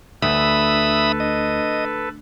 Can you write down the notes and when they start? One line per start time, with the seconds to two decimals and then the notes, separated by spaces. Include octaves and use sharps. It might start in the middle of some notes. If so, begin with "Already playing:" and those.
0.22 D2 A4 B4 E5 B5 D#6
1.20 D#5